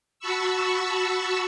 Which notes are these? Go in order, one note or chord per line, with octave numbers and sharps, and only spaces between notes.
F#4 A5 B5 C#6 E6